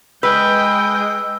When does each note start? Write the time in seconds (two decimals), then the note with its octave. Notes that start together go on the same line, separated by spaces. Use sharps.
0.23 G#3 B4 D#5 G5 E6